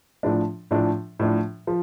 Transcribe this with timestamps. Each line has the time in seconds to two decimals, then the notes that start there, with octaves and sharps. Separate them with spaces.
0.23 A2 F3 D4
0.71 A2 F3 D4
1.19 A2 F3 D4
1.67 F3